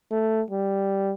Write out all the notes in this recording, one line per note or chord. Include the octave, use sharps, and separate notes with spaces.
A3
G3